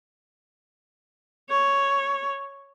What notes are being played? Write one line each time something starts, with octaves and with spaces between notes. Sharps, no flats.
C#5